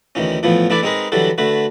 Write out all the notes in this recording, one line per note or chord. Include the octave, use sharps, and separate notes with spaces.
D2 D#3 E3 C#4
A2 E3 F3 A3 B3
E3 A3 D4 E4 B4 D5
G#3 C4 D#4 G#4 A#4 B4
D3 E3 F#3 G3 F#4 A4
D3 A3 F#4 B4